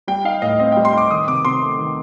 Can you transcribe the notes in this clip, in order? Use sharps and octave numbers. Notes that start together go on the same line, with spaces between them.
G3 G5
D#4 F5
A2 D#5
C4 D#5
G3 G5
C6
D#4 D6
D#3 D#6
C3 D6
C3 C6
A3
D#3